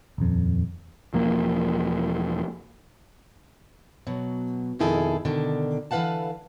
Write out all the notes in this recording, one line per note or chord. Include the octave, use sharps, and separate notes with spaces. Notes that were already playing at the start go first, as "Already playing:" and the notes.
D#1 F2
E1 F3 A#3
B2 F#3
F2 B2 D#3 E4 G#4 A4
B2 D3 D#3 D4
D3 E3 B4 F5 F#5 A5